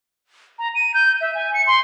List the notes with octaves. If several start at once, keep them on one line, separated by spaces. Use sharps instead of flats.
A#5
D#7
G6
E5
G#5
C#7
C6